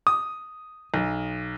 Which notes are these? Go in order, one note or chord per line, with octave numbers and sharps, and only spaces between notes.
D#6
B1